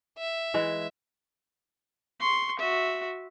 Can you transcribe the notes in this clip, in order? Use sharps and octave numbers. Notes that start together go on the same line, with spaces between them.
E5
E3 G#3
C6 C#6
F#4 E5